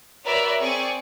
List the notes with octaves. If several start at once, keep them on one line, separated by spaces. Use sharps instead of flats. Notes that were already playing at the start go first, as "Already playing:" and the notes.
F#4 A#4 B4 C#5 D5 E5
C4 G#4 D5 G#5 C#6